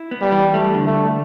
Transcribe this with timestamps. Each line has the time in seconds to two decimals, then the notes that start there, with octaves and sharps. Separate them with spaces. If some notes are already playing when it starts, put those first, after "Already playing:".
Already playing: E4
0.11 B3
0.21 G3
0.32 E3
0.54 G3 A3
0.74 D3
0.86 A3
0.97 D2